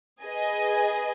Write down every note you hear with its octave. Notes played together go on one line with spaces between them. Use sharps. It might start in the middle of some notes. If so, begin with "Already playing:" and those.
G#4 B4 D#5 G#5